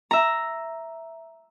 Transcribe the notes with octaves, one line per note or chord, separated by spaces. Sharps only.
E5 A#5